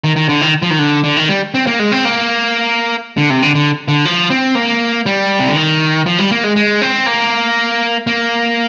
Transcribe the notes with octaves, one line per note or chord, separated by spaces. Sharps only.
D#3
D#3
D3
D#3
F3
D#3
D3
D3
D#3
G3
C4
A#3
G#3
C4
A#3
D3
C3
D3
D3
D3
F3
C4
A#3
G3
C3
D3
D#3
F3
G3
A#3
G#3
G#3
C4
A#3
A#3